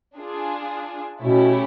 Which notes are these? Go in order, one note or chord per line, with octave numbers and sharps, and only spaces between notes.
D4 F4 G#4
B2 A3 C#4 E4 G4